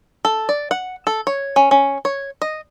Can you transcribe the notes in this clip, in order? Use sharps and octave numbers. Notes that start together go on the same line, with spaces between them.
A4
D5
F#5
A4
C#5
C#4
C#4
C#5
D#5